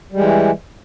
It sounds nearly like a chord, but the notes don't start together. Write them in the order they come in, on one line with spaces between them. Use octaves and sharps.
G3 G#3 E3